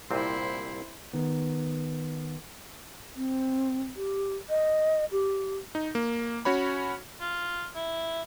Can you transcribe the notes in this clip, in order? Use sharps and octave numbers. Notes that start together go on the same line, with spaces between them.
C2 A#2 C4 E4 C5
D#3 B3
C4
G4
D#5
G4
D#4
A#3
C#4 F#4 C#5 B5
F4
E4